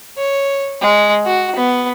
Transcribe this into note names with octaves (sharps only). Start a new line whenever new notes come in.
C#5
G#3
F#4
B3